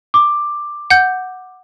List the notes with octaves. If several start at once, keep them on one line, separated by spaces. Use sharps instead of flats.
D6
F#5 G6